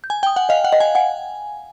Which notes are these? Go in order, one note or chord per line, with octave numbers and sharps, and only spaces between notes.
G6
G#5
G5 D#6
F#5
D#5 F5
F#5
D#5
G#5
F#5 G#5